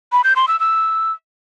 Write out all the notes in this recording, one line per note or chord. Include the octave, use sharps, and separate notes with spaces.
B5
G6
C6
E6
E6